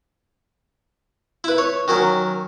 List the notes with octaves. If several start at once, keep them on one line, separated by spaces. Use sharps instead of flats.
E4 B4
C#5
D#3 F#3 C#4